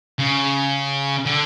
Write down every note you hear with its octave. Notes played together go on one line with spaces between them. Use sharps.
C#3
D3